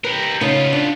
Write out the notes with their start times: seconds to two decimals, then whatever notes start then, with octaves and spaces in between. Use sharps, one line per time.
0.04 G4 A#4 B4
0.41 C#3 A3 B3 D#4 F4
0.73 D4